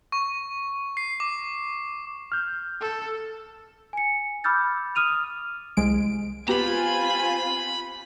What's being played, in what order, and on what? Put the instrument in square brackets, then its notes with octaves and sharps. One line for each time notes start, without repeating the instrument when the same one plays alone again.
[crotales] C#6
C7
D6
[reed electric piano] F6 G6
[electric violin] A4
[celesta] G#5 C#7
B5 D6 E6 F6 G6 A6
D#6 F6 D#7 F7
[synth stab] C2 G#3 D7
[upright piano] B3 G4 [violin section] C4 F4 G#5 [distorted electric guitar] A#5 B5